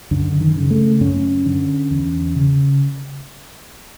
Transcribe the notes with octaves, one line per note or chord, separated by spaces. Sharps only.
F#2 D3
D#3
C#3
A3
F#2 C#4
D3
E2
C#3